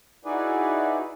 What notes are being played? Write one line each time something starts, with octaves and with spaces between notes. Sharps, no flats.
D#4 E4 F#4 G#4 B4 D5